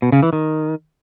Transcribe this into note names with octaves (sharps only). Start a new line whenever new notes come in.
B2
C#3
E3
D#3